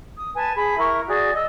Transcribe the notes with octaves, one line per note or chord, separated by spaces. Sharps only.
D#6
B4 G#5 A5
G#4 B5
E4 A#4 C#6
F#4 G#4 D5
D#5 E6